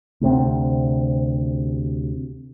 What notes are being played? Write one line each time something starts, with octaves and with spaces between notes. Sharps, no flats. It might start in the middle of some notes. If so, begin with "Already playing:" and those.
D2 C3 C4